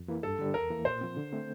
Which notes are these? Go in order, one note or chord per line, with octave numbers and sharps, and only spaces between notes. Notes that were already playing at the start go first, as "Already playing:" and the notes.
Already playing: F2
E3 A#3 E4
G2 A4
D3 G3
E2 A#4
E3 A#3
A#2 C5
F3 C4
D3
A3 C4